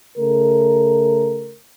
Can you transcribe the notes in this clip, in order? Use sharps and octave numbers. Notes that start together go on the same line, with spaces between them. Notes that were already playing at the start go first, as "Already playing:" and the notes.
C#3 A3 A#4